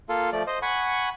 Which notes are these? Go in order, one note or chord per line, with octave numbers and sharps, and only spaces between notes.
A#3 F4 A4
F3 A3 D5
C5 D#5
F#5 G#5 B5 C#6